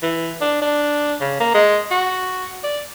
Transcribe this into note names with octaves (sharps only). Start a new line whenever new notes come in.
E3
D4
D4
C#3
A#3
G#3
F#4
D5